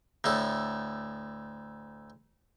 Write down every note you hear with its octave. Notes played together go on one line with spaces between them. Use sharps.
D2 A2 A4